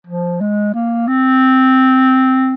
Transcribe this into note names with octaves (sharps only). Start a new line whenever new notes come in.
F3
G#3
A#3
C4